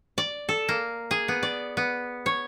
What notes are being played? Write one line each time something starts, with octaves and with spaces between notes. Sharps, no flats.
D5
A4
A#3
G#4
B3
D5
B3
C#5